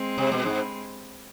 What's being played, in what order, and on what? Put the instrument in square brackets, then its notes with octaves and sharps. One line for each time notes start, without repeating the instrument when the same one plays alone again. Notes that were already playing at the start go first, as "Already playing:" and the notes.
Already playing: [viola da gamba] G#3 C4
[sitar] C3
B2
G#2